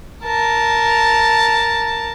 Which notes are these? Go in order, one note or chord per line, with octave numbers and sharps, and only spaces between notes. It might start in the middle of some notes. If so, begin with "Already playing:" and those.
A#4 A5